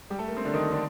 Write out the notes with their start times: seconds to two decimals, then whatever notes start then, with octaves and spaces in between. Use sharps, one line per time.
0.10 G3 G4
0.19 A3 A4
0.28 A#3
0.37 C4
0.45 D3 D4
0.54 D#3 D#4
0.71 D3 D4